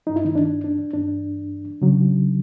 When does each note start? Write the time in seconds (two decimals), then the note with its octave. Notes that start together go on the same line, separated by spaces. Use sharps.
0.06 G2 E3 D#4
0.16 E4
0.25 D#3 D#4
0.35 D4
0.64 D4
0.94 G2 E3 D4
1.81 C#3 F#3